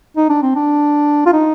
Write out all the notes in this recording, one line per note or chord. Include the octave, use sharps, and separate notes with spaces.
D#4
D4
C4
D4
F4
D#4